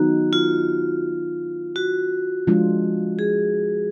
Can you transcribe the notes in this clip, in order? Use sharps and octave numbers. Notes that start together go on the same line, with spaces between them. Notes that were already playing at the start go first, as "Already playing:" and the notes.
Already playing: D#3 F#3 B3 D#4 F#4
F4
F#4
F3 G#3 D4 F4
G#4